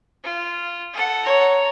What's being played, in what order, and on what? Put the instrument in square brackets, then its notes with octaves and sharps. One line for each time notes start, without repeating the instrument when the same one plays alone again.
[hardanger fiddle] F4
A4 F#5
[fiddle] C#5 A#5